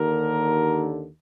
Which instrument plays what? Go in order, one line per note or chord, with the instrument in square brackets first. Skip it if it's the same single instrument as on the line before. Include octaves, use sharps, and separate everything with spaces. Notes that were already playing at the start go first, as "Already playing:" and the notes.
Already playing: [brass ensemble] D#2 D3 A#4